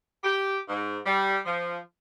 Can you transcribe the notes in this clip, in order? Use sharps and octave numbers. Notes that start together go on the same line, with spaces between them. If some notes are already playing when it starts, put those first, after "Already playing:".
G4
G#2
G3
F3